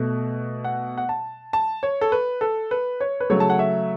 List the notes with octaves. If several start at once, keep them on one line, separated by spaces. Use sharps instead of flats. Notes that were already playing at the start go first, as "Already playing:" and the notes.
Already playing: B2 A3
F#5
F#5
A5
A5
C#5
A4
B4
A4
B4
C#5
B4
C#3 F#3 A3 C#5
A5
F#5
E5